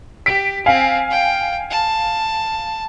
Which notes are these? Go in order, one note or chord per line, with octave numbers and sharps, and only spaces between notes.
G4 B6 D7
C4 F5 G#5
G5
A5